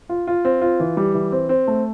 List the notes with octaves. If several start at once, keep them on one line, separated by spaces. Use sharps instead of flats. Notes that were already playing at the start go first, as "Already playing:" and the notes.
F4
F4
C4
F4
E3
G3
E3
C4
C4
A3